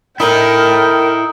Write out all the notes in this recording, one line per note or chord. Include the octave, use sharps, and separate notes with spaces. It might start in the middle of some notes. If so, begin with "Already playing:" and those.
D#4 E4 A4 A#4 G5